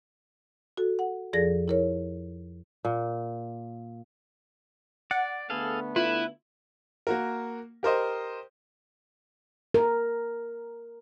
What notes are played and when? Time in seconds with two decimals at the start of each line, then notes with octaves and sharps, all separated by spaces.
0.77 F#4 A4
0.99 F#5
1.33 F2 F3 G#4 A4 D5 A#6
1.68 E4 A#4 C#5
2.85 A#2
5.11 D5 F#5
5.50 D3 A3 B3 G#4 A4 F5
5.96 E4 F4 B4
7.07 A#3 F#4 A#4
7.83 G4 A#4 C5 D#5
9.74 A#4